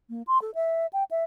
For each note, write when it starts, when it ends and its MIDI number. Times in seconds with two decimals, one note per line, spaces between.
0.10 0.23 58
0.27 0.41 84
0.42 0.51 69
0.55 0.87 76
0.93 1.04 79
1.11 1.24 76